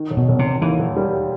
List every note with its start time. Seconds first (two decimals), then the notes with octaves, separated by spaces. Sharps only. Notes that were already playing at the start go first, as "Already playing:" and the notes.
Already playing: D#3
0.10 E1
0.17 B2
0.28 E1
0.39 C3
0.45 E1
0.62 D#2 E3
0.79 E1
0.96 G3